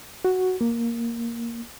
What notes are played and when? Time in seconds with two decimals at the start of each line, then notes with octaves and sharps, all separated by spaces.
0.25 F#4
0.61 A#3